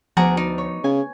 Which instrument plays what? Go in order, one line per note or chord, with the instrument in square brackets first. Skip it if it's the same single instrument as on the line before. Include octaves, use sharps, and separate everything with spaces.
[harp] D2 B3 D5 [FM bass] F3 [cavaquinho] F#4 G#4 A#5
[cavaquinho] D#4 [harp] D5
[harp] C#5
[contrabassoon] C#3 [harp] G#5